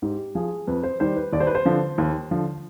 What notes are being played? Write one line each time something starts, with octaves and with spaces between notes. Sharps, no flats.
G#2 G4
F3 G#4
F2 B4
C5
D#3 G3 C5
B4
D#2 D5
C5
B4
C5
D3 F3
D#2
D3 F3